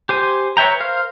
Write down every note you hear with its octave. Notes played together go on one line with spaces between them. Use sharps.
G4 C5 G#5
B4 C#5 E5 G5 A#5
A#4 C5 F5